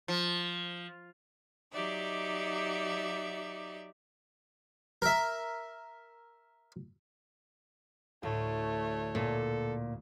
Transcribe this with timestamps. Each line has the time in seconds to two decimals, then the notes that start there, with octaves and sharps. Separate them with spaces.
0.08 F3
1.72 F#3 D#4 G4 D5 E5
5.02 A#4 E5
8.23 D2 A2 A3 C#5
9.15 A#2 A4